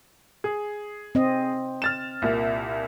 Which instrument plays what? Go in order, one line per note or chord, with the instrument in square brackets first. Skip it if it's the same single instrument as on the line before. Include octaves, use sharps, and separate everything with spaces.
[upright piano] G#4
[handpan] C4 D#5
[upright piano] F6 A6 E7
C2 A#2